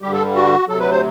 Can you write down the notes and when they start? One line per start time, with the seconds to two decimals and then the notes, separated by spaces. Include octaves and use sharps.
0.02 G2 D3 G3 G4
0.13 A4
0.35 F#4
0.68 D2 C3 F#3 A4
0.80 B4
0.91 C5